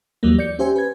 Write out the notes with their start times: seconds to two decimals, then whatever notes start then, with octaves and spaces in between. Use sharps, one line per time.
0.23 D#2 E3 F#3 G3 A#3
0.38 D5 G6 C#7
0.59 C#4 G4 C5 E5 G#5
0.76 B4 G#6